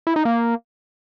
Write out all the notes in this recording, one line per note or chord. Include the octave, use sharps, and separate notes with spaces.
E4
D#4
A#3